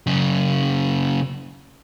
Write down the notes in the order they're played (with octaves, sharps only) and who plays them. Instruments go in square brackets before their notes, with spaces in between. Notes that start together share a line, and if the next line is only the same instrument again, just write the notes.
[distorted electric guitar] F#2 C#3